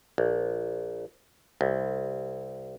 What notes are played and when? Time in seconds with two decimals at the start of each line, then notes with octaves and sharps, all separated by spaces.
0.18 A#1
1.61 C2